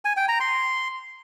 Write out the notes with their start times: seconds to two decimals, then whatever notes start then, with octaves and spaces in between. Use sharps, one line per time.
0.05 G#5
0.17 G5
0.28 A#5
0.40 C6